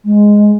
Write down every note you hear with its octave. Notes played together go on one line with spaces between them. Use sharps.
G#3